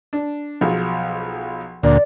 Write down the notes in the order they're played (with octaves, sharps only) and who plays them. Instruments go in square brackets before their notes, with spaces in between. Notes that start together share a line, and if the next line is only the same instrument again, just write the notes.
[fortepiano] D4
B1 F3 G#4
[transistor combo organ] D2 A#2 [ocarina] D5